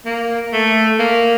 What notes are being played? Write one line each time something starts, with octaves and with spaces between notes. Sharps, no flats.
A#3
A3
A#3